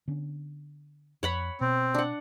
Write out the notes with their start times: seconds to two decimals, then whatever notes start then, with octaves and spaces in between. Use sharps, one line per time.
0.08 D3 B3 C#4
1.23 F2 C#5 F#5 B5
1.61 B2 C4
1.95 D4 F#5